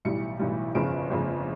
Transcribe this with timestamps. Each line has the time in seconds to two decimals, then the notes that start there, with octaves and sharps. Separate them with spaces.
0.05 B1 A2 E3 G3 C#7
0.39 B1 A2 E3 G3
0.75 G1 F2 C#3 D7
1.10 G1 F2 C#3